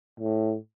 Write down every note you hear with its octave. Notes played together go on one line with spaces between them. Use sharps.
A2